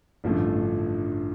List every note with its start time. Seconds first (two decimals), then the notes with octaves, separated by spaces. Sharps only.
0.24 A1 G2 D3 F3 A3